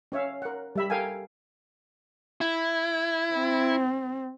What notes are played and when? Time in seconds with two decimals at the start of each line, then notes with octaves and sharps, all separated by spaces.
0.12 C#4 C#5 E5 F5
0.42 A#4 F#5
0.76 G3 E5 B5
0.90 A4 A#4 F5 G5 G#5
2.41 E4
3.34 C4